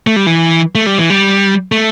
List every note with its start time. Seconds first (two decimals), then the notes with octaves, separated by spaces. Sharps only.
0.07 A3
0.16 G3
0.26 E3
0.75 A3
0.86 G3
0.98 E3
1.10 G3
1.72 A3